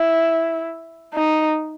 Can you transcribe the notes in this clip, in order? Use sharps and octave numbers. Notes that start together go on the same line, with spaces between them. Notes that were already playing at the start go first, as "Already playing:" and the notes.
Already playing: E4
D#4